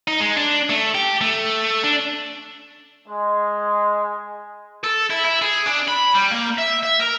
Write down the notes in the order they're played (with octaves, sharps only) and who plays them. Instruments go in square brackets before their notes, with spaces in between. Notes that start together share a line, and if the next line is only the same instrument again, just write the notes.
[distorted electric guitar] D#4
G#3
D4
A3
G4
A3
D4
[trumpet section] G#3
[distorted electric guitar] A4
E4
E4
G#4
D4
B5
G3
A#3
E5
E5
A#4